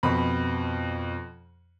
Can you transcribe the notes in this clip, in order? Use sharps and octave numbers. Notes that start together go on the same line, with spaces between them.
F2 B2 B5